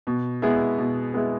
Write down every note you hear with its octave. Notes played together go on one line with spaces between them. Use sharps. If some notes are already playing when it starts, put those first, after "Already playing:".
B2
G#3 B3 E4 G#4
B2
G#3 B3 E4 G#4